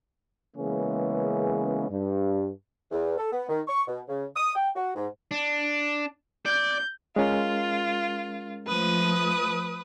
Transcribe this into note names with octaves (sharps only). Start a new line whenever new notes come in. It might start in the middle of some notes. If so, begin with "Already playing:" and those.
C#3 E3 G#3 A#3 B3 C#4
G2
E2
A4
B3
D#3
C#6
B2
C#3
D#6
G5
F#4
G#2
D4
D5 G6
G#3 C#4 F4 A#4
F3 A3 B4 D#6